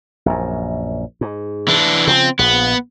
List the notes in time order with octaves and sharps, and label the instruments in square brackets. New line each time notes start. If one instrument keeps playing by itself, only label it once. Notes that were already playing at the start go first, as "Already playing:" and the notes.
[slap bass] A#1 F#2
G#2
[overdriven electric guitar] E3 D4
[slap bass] C#3 E3 F3 [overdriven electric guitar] C4
[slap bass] A#1 [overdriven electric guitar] B3